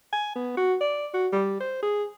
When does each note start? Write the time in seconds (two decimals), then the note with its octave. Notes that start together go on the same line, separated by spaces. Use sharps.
0.13 G#5
0.35 B3
0.57 F#4
0.81 D5
1.14 F#4
1.32 G3
1.60 C5
1.83 G#4